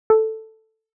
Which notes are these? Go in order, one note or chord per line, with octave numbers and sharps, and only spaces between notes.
A4